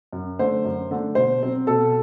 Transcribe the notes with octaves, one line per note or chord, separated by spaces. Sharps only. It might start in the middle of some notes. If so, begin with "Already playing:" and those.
F#2
D3 A3 C5
F#2
D3 A3
B2 C5
F#3 C4
B2 A4